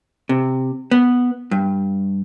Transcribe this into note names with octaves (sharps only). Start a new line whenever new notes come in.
C3
B3
G2